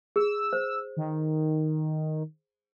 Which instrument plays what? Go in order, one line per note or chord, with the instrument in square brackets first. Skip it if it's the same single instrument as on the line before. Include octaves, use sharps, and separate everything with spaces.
[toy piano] G#4 [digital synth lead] E6
[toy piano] C5
[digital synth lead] D#3